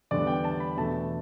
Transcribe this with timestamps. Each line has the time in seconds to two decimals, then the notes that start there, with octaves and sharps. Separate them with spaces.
0.11 E2 D3 G3 B3 D5
0.27 G5
0.44 A5
0.60 B5
0.77 E2 B2 A3 D4 A5